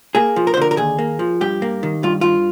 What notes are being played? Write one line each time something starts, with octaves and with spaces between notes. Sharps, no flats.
A#3 G#4
F3
A#4
C5
D3 A#4
A#4
D#2 G#4
A#3
F3
G2 G4
A#3
D#3
G2 F4
G2 F4